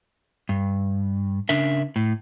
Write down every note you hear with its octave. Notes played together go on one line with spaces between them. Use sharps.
G2
C#3 D4 A#4 E5
A2